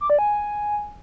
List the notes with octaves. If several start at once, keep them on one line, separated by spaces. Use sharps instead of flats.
D6
D5
G#5